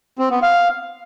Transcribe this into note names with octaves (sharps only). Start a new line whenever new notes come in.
C4
B3
F5